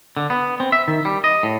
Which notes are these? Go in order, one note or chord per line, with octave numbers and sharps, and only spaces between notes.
D3
B3
C4
E5
D#3
G3
D#5
A2